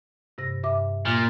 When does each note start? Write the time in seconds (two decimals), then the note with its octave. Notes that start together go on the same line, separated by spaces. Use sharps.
0.38 G2 C3 A#6
0.63 G2 E5 D6
1.05 A#2 F6